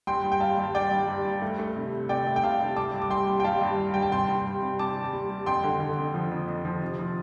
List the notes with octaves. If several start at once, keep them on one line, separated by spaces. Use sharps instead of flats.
G2 G5 C6
G3
G5
G3 F5 A5
G2
G3 D5 G5
G2
G2
G3
A3
A3
C3
C3
C3 D5 G5
A3
G5
C3 F5 A5
C3
G3 A5 D6
G2
D6
G2 G5 C6
G3
G5
G3 F5 A5
G2
G3
G2 G5
A5
C3 G5 C6
G3
G3
C3
C3 A5 D6
G3
G3
G3
F2 G5 C6
D3
D3
F2
F3
F2
F2
F3
C3
F3